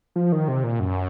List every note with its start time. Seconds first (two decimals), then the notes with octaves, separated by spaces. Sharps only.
0.16 F3
0.32 D#3
0.48 C3
0.64 A#2
0.80 F#2